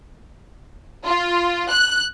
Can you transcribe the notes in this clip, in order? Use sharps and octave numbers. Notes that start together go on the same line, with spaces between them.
F4
F#6